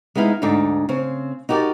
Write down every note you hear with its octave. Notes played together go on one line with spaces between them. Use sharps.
G#3 B3 D#4 E4 F5
D2 G#2 D4 D#4 A4
C#3 C4 C5
D#4 F#4 G4 A#4 D5